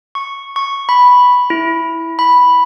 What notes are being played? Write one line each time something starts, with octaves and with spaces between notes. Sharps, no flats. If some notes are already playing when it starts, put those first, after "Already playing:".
C#6
C#6
B5
E4
B5